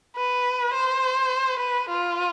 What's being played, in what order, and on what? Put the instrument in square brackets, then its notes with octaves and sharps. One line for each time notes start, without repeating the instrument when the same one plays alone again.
[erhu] B4
C5
B4
F4